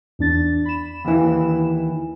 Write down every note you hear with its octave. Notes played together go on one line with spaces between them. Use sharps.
E2 D4 A6
B5 E7
D#2 E3